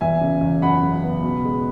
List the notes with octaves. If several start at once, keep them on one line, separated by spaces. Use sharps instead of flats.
E2 E5 G#5
C#3
E2
F#2 F#5 B5
C#3
B3
B2
G#3